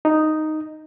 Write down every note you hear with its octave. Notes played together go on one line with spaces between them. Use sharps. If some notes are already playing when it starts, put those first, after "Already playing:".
D#4